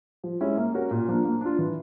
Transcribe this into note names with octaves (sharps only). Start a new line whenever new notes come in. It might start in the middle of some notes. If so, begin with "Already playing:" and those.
F3
G#3 C#4 E4
A#3
C#4 F#4 A#4
A#2
F3 A#3 D4
A#3
D4 F4
E3